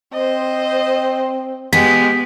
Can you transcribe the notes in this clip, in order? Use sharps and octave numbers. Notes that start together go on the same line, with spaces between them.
C4 C5 D#5
G#3 B3 G4 B6